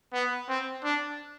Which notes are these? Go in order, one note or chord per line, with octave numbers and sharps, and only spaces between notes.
B3
C4
D4